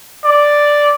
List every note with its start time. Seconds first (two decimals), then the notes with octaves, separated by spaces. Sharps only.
0.24 D5